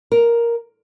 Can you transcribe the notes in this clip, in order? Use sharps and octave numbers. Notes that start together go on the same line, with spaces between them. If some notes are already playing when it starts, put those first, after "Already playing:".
A#4